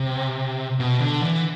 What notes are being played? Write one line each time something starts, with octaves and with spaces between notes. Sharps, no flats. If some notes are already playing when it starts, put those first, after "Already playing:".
Already playing: C3
B2
D3
E3